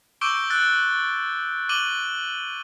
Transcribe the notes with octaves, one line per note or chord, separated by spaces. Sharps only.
C#6 D6 E6 G6 D7 G7
E6 F#6 A6
D6 D#7 F#7 G7